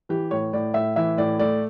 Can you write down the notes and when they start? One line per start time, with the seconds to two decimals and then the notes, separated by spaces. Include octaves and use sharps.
0.09 E3 G4
0.31 A2 C#5
0.53 A2 D5
0.74 A2 E5
0.96 E3 E5
1.18 A2 D5
1.39 A3 D5